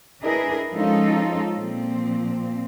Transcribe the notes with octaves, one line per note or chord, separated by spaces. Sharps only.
D4 E4 G#4 A#4 B4 D#5
F3 G#3 C#4 D#4 F4 A4
A#2 F3 C4